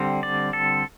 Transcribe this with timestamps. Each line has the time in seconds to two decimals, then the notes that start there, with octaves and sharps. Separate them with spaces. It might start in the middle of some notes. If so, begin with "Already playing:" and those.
Already playing: D3 G3 C4
0.23 D5
0.53 A4